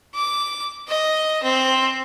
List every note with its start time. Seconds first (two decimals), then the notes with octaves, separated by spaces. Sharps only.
0.15 D6
0.88 D#5
1.43 C4